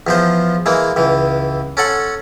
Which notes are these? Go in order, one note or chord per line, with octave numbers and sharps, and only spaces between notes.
E2 F3 C5
E3 G#3 A#3
C#2 E3
C#4 A4 F#5 C6